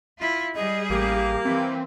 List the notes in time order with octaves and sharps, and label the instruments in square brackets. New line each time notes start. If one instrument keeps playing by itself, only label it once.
[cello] E4 F4
[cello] G3 G#4 [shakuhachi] D#5
[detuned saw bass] A1 [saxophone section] A#3 [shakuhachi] G4
[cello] E3 [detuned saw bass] C4